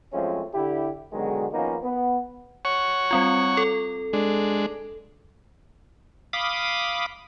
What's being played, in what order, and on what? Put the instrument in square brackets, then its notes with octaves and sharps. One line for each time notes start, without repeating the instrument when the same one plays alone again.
[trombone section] F#2 F3 G#3 A3 C4 C#4
D3 E4 G4
B2 D3 D#3 F#3 G#3
D#3 F3 A#3 B3 C#4 D#4
B3
[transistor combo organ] C#5 F#5 C#6
[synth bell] G3 C4 F4
A4
[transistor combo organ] G#3 D4
[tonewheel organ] F5 B5 D6 D#6